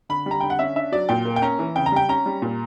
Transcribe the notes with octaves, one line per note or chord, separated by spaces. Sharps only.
D3 B5
G3 A#5
D3 G5
F#5
C#4 E5
D4 E5
F#3 D5
A#2 G5
A#3
G5
C#4 A#5
E3
C#3 G5
A#5
G3 G5
C#4 A#5
G3
A#2